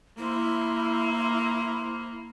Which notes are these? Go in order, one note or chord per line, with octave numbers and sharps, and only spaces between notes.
A#3 E4 C5